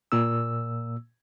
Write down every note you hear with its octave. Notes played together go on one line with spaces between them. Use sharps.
A#2 A#3 E6